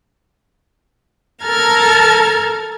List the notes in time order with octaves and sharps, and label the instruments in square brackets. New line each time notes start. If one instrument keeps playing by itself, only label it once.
[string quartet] A4 A#4 A5 A#5 F6 G#6